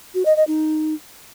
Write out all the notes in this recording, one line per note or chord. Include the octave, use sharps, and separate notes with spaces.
F#4
D#5
D#5
D#4